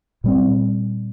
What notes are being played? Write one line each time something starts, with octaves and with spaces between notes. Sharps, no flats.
A#2 G3 C4